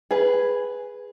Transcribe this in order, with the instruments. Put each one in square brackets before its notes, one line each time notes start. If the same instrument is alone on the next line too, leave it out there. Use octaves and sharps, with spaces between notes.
[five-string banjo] G#4 B4